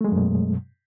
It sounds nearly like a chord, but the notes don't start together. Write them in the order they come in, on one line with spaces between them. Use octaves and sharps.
A3 G#3 F#3 F#2 B2